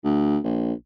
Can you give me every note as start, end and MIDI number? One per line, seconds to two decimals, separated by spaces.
0.05 0.38 38
0.44 0.73 34